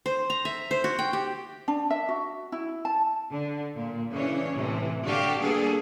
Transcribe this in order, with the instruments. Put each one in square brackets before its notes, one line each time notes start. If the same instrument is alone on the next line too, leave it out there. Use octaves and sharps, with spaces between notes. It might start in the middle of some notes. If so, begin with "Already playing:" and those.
[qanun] C5
A#5
E5
C5
F#4
G5
G4
[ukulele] D4
E5
F#4
E4
A5
[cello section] D3
A#2
C#3 E3 C#4 D4 C#5
A2 C3 E3
D3 F#4 G4 A4 F5
G3 A#3 B3 D4 G#4 A4